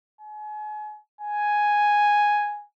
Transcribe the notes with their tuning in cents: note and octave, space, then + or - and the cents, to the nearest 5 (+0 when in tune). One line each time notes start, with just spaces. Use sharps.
G#5 +35
G#5 +0